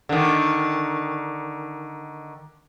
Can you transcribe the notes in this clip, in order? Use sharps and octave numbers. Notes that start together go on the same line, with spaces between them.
D3 D#3